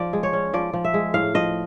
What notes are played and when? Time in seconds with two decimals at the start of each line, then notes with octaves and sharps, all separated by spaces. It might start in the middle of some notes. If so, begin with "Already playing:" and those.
Already playing: F3 D5
0.13 G#3
0.23 C#5
0.33 C#4
0.53 F3 D5
0.73 F3
0.84 E5
0.94 G#3
1.14 A2 F5
1.34 F3 D#5